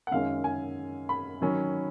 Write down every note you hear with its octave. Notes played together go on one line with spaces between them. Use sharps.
F#5
F#2 D#3 G#3 C#4 F5
G#5
B5
D#3 F#3 C#4